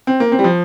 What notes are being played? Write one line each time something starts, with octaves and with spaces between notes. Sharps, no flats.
C4
A#3
C4
G3
F3